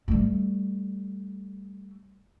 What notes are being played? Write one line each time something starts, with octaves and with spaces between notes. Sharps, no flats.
G3 A3